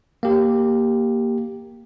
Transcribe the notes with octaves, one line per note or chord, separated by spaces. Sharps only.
A#3 G4